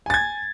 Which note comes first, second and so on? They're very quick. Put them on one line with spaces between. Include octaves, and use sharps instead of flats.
G#5 A6 G#6